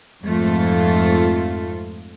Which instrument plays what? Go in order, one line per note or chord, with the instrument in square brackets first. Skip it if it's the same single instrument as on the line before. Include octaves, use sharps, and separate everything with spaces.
[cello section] F2 G#2 A3 F4